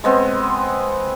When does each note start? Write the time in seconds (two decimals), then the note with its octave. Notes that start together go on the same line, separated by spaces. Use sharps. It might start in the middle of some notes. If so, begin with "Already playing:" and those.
0.04 G#3 B3 C4